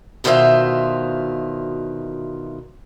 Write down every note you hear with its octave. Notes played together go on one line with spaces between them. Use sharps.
D2 B2 D#3 F4 C5 E5